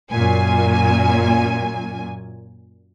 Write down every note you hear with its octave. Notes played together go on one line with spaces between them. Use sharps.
F#2 A#2 G#5